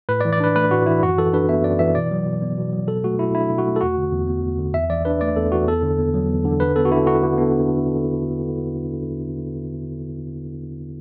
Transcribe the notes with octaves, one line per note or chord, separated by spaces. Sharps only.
A2 B4
D5
E3
D5
D4 B4
A3 B4
A2 F#4
E3 E4
F#2 F#4
E3 A4
D4 B4
B3 E5
F#2 D5
E3 E5
B2 D5
F#3
B2
B3
B2
F#3
B2 A4
A3 F#4
B2 E4
D4 E4
B2
F#4
A3
A4
E2 F#4
D3
E2
B3
E2
D3
E2 E5
E3 D5
D4 B4
A3 D5
E2 A4
E3 F#4
E2 A4
D3
B3
F#3
E2
D3
D3 B4
B3 A4
F#4
D3 E4
D4 F#4
D3
B3